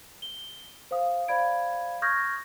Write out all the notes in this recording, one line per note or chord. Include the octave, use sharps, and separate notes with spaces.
G7
C5 F5 D#6
C5 D5 F5 B5 G#6 D7
C#6 D#6 F6 G6 G#6 A#6